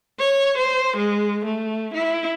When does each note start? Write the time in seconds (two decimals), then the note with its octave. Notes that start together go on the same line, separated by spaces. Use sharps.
0.19 C#5
0.57 C5
0.97 G#3
1.45 A3
1.94 E4